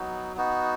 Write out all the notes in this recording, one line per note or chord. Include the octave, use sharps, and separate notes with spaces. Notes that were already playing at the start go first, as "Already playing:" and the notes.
Already playing: F#3 B3 D#4 F#4
B3 D#4 F#4